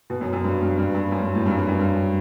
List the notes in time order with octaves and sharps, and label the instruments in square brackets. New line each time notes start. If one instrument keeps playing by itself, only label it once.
[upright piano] B2
F#2
F#2
G2
G2
G2
G2
F#2
G2
A2
G2
F#2
G2
F#2
G2